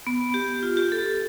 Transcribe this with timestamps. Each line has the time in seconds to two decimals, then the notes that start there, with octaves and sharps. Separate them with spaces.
0.07 B3
0.34 G4
0.63 F4
0.77 G4
0.92 A4